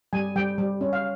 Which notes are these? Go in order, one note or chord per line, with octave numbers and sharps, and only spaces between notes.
G3 G#5
G3 G5
G3
C#4
F5